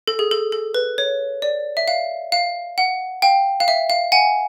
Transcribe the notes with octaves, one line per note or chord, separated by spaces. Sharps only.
A4
G#4
A4
A4
B4
C#5
D5
E5
F5
F5
F#5
F5 G5
F5
E5
F5
F#5 G#5